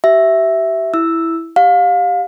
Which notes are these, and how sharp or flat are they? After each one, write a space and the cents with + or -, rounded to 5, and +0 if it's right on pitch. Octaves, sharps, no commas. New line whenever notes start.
G4 -35 E5 +0
E4 +0 E6 +0
G4 +0 F5 +30